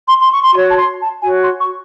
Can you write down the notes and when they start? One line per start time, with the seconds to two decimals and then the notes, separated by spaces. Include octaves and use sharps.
0.08 C6
0.21 C6
0.32 C#6
0.43 C6
0.54 F#4 C#6
0.58 C#5
0.69 A5
0.77 C6
1.00 A5
1.24 F#4 C#5 G#5
1.41 C6
1.59 C#6